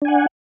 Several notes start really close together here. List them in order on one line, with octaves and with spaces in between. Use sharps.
D4 G#5 F#5